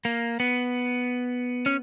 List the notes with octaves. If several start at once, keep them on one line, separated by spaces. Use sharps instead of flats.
A#3
B3
C#4